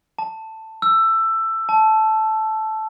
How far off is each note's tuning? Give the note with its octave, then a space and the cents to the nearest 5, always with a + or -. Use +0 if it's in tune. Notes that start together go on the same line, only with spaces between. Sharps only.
A5 +10
E6 +15
A5 -10